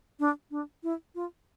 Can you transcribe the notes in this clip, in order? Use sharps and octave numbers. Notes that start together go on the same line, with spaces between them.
D4
D4
E4
F4